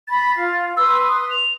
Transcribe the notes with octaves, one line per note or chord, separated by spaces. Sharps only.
B5 A6
F4 F5
B4 C6 E6
D#6
F7